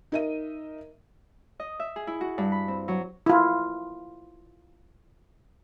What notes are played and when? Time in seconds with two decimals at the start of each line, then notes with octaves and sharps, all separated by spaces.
0.12 D#4 A#4 D#5 E5 D#7
1.60 D#5
1.80 E5
1.96 G#4
2.07 E4
2.21 F#4
2.38 G2
2.52 B5
2.68 C4
2.88 F#3
3.26 E4 F4